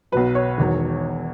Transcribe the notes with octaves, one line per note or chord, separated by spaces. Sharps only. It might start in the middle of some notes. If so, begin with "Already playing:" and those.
B1 B2 F#3 B4
C#5
E1 E2 D#3 F#3